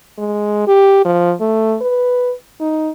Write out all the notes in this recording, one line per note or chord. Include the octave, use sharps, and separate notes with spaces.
G#3
G4
F3
A3
B4
D#4